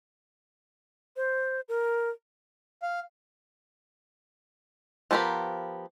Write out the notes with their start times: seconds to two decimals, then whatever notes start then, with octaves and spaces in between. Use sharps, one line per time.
1.16 C5
1.69 A#4
2.82 F5
5.11 F3 B3 G4 A#4 B5